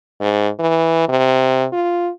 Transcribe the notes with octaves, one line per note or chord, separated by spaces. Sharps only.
G#2
E3
C3
F4